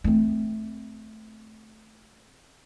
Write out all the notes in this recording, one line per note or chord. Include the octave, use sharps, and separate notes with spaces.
A3 C4